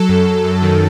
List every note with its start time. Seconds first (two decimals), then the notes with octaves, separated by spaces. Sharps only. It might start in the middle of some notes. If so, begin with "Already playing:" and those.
Already playing: F#3 A4
0.09 F#2
0.27 F#2
0.44 F#2
0.62 D#3